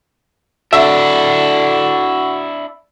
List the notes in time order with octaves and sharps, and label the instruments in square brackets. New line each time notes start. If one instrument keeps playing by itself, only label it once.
[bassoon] D3 [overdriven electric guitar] D4 E4 [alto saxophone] F#4 [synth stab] E5